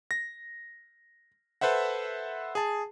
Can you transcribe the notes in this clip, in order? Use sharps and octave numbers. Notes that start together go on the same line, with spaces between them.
A#6
A4 B4 C5 E5 F#5
G#4 A5